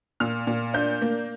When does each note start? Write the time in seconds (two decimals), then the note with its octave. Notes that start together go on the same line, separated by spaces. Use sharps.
0.20 A#2 F6
0.47 A#2
0.74 D4 G6
1.02 A#3